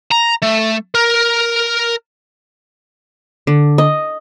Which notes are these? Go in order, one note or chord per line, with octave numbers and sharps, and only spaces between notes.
A#5
A3
A#4
D3
D#5